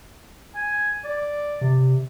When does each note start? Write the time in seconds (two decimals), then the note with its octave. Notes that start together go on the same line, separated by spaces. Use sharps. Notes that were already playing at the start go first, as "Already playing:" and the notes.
0.55 G#5
1.04 D5
1.61 C3